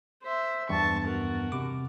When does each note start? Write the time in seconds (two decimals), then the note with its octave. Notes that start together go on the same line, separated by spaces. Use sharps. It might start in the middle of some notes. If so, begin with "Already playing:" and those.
0.23 C5 E5
0.69 E2 G2 B3 A5 C#6
1.06 F#4 A#4
1.52 C3 D6